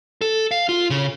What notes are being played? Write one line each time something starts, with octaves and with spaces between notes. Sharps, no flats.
A4
F5
F4
C#3